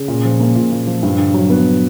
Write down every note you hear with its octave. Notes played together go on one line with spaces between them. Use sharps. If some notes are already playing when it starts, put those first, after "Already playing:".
Already playing: C#3
A#2
F3
A#3
A#2
A#2
F3
G2
D3
F#3
B3